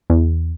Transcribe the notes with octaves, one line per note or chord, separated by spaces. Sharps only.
E2